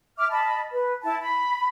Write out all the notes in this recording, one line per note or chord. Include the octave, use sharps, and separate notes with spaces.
E5 D6 F6
D#5 A5 B5
B4
E4 A5
B5